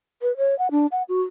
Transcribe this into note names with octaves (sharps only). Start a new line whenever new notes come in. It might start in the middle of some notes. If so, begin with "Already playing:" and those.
B4
C#5
F#5
D4
F#5
F#4